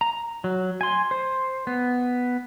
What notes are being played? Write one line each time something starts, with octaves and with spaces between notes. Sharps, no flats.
A#5
F#3
G#5 C6
C5
B3